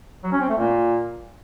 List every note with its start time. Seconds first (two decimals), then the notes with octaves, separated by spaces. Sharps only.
0.24 F#3
0.32 C#4
0.41 C4
0.49 A3
0.58 A#2